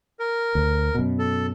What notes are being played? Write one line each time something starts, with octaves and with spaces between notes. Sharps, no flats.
A#4
D2
F#2 B2
A4